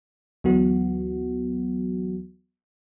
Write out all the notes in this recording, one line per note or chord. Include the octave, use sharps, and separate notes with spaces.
D2 E3 F#3 B3 F#4